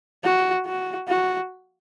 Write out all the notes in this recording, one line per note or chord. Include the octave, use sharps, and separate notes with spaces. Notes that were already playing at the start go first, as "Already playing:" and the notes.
F#4
F#4
F#4